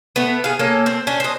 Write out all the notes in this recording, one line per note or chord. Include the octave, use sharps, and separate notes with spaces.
A3 B3
G#4 F5
A#3 C#4 A4
C4
C#4 D4
C5 D#5